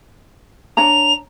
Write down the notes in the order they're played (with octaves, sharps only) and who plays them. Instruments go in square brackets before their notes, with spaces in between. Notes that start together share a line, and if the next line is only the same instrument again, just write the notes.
[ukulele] D4 C#5 A#5 [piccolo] F7